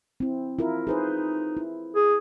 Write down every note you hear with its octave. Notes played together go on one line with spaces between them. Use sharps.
C4 E4
E4 F4 A#4
D#4 G#4 B4 C5
E4
G#4